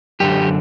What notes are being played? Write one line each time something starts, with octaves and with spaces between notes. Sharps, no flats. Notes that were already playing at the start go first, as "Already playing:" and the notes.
F#2 D3 G4